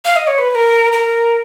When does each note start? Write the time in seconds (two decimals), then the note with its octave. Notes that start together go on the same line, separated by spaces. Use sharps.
0.05 F5
0.16 D#5
0.27 C#5
0.38 B4
0.50 B4
0.55 A#4
0.92 A#4